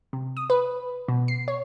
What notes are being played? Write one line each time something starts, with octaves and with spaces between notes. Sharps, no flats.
C3
D#6
B4
B2
C7
C#5